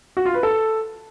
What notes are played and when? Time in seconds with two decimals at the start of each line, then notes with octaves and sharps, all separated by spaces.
0.17 F#4
0.25 F4
0.34 B4
0.43 A4